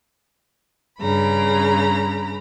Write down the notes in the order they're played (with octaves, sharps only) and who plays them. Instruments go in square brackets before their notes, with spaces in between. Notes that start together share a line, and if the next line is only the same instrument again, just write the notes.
[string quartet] G2 C#3 A#5 B5